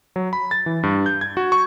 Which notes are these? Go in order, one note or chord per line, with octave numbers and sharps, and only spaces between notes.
F#3
B5
A6
E3
G2
G6
G#6
F#4
C#6